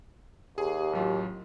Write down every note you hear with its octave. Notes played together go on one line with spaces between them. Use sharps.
D#2 G4 G#4
A1 F#3 F4